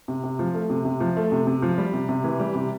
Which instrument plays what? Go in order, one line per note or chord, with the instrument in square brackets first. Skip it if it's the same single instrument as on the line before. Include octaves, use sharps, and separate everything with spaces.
[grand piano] C3
C3
F3
A3
C3
C3
F3
A3
C3
C3
F3
G3
C3
C3
E3
G3
C3